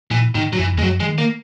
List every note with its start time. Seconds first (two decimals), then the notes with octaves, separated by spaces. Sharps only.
0.11 A#2 E3
0.35 G#2 D#3
0.53 F#3
0.58 F#2 E3
0.73 E2
0.79 G#3
0.82 F#2 F#3
1.00 E3 G#3
1.06 D#3
1.18 A#3